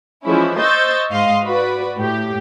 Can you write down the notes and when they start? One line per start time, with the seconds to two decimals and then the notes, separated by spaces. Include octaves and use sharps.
0.25 E3 F3 G#3 C#4 E4
0.58 C5 D#5 C#6 E6 G6 A6
1.11 G#2 D#5 F5 C6
1.43 F#4 B4 D5
1.99 A2 G4